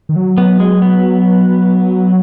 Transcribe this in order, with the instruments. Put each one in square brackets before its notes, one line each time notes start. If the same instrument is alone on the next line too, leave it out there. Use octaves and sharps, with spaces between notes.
[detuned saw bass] D#3
F#3
[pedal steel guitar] B3
G#3
B3
[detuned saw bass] F#3